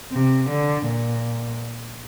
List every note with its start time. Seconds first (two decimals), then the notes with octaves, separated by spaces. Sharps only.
0.12 C3
0.50 D3
0.87 A#2